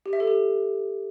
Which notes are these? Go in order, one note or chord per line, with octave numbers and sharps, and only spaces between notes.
G4
E5
A4
G4